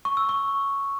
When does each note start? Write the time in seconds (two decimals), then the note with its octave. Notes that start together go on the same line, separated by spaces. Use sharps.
0.05 C#6
0.17 E6
0.29 C#6